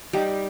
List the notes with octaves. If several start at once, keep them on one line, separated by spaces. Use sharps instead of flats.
G3 D#4 G4